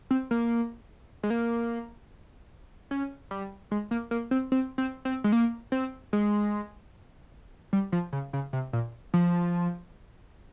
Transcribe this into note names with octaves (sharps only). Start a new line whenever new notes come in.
C4
A#3
G#3
A#3
C#4
G3
G#3
A#3
A#3
C4
C4
C4
C4
G#3
A#3
C4
G#3
G3
F3
C#3
C#3
C3
A#2
F3